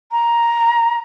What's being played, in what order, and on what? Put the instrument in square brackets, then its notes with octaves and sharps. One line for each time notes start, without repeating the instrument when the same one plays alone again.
[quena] A#5